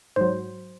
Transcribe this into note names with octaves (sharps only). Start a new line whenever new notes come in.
G#2 F#3 C5